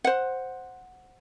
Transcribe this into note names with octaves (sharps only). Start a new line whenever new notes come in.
C5 F#5